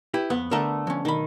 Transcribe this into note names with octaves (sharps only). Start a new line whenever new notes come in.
E4 G4 B4
F2 B3
D3 A3 A#4 A5 A#5
F3 C#4
B1 D#3 B5